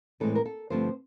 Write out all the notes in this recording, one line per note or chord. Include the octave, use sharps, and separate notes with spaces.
A2 E3 G#3 C4 A4
A#4
A4
G2 D3 F3 A3 C4 C5